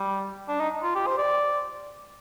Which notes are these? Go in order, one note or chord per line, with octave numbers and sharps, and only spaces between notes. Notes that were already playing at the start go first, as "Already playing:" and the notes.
Already playing: G3
D4
D#4
F4
G4
C5
D5